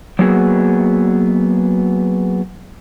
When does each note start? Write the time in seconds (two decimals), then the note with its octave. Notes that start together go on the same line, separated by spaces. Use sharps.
0.19 F#3 A#3 B3 F#4 G#4